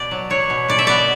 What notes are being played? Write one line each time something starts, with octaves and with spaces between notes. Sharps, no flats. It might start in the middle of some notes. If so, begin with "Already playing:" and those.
Already playing: B2 D5
F#3
F#3 C#5
B2
B2 D5
E5
B3 D5